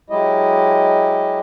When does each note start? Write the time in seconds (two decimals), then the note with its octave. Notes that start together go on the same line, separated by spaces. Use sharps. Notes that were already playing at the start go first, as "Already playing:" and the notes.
0.10 F#3 G#3 E4 G4 D#5